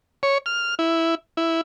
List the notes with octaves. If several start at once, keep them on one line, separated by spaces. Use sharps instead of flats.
C#5
F6
E4
E4